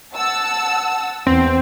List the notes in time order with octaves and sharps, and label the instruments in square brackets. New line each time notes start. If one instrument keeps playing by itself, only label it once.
[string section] F#5 A5 E6
[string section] E2 [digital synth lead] C4